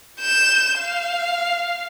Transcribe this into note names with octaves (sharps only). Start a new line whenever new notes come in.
G6 E7
F5